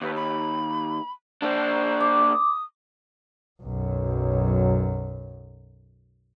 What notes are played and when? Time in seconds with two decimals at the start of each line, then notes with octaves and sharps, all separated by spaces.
0.01 D#2 B4
0.16 B5
1.42 A#3 D4 C5
2.01 D6
2.32 D#6
3.62 B1 F#2